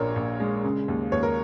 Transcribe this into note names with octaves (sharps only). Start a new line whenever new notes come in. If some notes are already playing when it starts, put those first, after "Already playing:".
Already playing: A#1 A#2 A#4 C#5
A#1
G#3
C#3
D#2
D#2 C#5
A#4